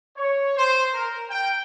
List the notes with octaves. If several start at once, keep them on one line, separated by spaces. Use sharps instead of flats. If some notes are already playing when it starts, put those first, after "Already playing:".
C#5
C5
A#4
G5